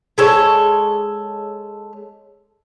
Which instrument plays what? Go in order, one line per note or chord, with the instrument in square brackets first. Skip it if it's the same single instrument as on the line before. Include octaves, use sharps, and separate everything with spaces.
[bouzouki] G#3 A4 C#5